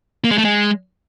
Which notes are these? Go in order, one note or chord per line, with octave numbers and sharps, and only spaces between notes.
A#3
G#3
A3
G#3